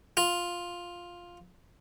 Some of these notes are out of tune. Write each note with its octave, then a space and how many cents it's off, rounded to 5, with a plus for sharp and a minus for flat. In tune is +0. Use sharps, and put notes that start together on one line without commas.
F4 +5